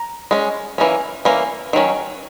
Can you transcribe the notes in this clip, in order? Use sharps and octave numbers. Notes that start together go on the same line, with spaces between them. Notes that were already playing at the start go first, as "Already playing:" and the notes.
Already playing: A#5
G#3 C#4
E3 A#3 C#4
E3 A#3 C#4
D#3 F#3 C#4